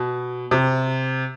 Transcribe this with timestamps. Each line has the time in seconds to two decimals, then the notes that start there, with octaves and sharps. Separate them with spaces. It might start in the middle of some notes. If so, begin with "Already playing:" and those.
Already playing: B2
0.51 C3